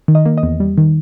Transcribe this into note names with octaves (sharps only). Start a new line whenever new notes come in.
D#3
D#5
A#3
D#5
E2
G3
D#3